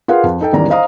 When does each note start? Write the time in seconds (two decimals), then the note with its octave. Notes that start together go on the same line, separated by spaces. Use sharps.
0.08 F4 G#4 A#4 B4 F5 F#5
0.23 F2
0.41 D#4 A4 G5
0.53 G#1 E2 G3 C#4 D5 A#5
0.69 C5 D#5 F5 A#5 D#6